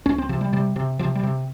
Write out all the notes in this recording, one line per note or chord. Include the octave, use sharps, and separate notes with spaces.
C#2 C#4
C4
C3 F3
G3
C3 G3
C3
C3 F3
G3
C3